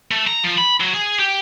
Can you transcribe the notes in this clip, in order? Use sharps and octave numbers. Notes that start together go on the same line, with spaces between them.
A3
A#5
F3
B5
F#3
G#4
G4